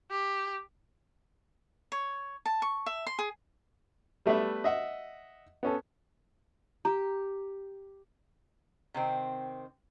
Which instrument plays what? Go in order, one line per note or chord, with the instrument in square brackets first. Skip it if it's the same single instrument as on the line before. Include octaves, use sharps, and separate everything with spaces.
[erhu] G4
[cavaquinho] C#5
A5
C#6
E5
C6
G#4
[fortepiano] G3 A3 B3 B4 E5
D#5 E5 F#5
B3 C#4 A4
[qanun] G4 [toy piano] A#5
[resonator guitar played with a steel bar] C3 D#3 C4